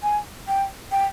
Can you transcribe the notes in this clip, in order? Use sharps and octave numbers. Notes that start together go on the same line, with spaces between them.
G#5
G5
G5